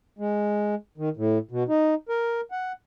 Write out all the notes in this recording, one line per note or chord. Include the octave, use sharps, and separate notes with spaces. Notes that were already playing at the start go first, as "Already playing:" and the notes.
G#3
D#3
A2
B2
D#4
A#4
F#5